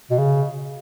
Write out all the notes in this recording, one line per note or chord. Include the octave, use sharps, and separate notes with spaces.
B2
C#3